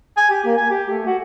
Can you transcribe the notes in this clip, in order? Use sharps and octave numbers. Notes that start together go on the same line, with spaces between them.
G#5
G4
A#3
G#5
G4
A3
F#4